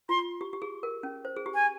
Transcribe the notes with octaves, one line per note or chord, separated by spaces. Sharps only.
F4 C6
G4
G4
G#4
A#4
C#4
C5
G#4
G4
G#5